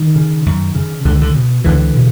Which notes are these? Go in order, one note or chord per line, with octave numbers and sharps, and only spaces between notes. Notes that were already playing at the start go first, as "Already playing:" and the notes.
Already playing: D#3
C#3
F#2
C#3
C#2 D3
D3
B2
C#2 D3 E3
B2